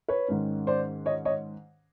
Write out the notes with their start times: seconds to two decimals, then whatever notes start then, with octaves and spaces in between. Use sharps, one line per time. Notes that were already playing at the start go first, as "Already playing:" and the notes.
0.08 B4 C#5
0.28 G#2 D#3 G#3 C#4
0.67 C5 D5
1.06 C#5 D#5
1.25 C#5 D#5